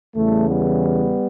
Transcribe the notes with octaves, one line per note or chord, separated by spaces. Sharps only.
E2 C#3 E3 G3 A3
G3 B3